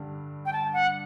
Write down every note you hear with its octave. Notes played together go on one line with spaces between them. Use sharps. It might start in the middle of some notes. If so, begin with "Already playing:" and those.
Already playing: G2 D3 G3 D4
G5
A5
F#5